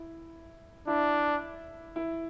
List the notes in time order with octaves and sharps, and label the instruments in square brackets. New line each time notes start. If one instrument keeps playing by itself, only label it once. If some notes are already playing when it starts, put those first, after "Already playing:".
Already playing: [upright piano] E4
[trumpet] D4 [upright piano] E4
[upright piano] E4